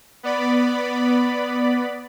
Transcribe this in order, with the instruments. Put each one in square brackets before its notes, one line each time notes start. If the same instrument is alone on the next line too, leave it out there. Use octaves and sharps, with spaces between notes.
[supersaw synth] B3 D5 B5